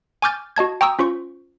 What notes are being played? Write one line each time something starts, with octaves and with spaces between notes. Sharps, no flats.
G#5 C#6 D6 F6 G6 A6
F#4 D#5 A5 G#6
G5 A#5 C#6 D#6 E6
C#4 F4 C5 C#6